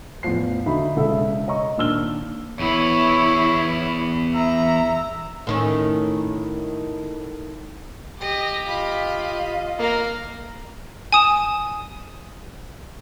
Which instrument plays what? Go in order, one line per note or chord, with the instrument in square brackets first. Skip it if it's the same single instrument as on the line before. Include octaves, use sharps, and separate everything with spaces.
[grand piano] A1 E2 A2 F3 C7
D3 D#4 F#4 E5 B5
E1 C#3 A4 E5
C#5 D#5 A#5 C#6
A#2 D#3 D4 E6 F6 G7
[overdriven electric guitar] E2 B3 [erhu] E4 [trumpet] C#5
[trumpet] E5 [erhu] A#5
[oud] A2 D#3 C#4
[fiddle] G4 [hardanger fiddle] D#5
[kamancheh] F4 D#5 [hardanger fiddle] B5
[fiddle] A#3 [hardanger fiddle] A#4 F5
[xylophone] G#5 D#6 E7